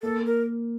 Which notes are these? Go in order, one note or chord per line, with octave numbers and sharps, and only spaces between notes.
A#3 A4
A#4